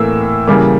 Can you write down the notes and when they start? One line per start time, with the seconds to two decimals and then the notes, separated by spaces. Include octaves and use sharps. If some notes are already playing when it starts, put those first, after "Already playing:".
Already playing: A2 E3 A#3 E6
0.47 C#3 E3 G3 A#3 D6